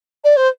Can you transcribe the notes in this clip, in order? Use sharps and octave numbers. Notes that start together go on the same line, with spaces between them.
D5
C5